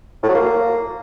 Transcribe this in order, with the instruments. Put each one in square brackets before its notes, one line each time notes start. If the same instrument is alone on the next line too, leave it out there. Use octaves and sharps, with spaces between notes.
[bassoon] A2
F#3
A#3